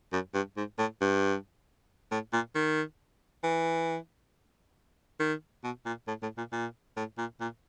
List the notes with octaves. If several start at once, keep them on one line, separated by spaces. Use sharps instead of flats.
F#2
G2
G#2
A2
G2
A2
A#2
D#3
E3
D#3
B2
A#2
A2
A2
A#2
A#2
A2
A#2
A#2